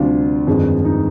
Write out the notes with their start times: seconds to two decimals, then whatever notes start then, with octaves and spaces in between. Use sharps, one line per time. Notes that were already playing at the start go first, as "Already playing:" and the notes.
Already playing: D2 C3 G3 D4 F4
0.47 G1 F2 D#3 G#3
0.85 D#4